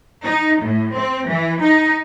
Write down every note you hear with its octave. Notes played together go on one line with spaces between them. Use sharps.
D#4
A2
C4
E3
D#4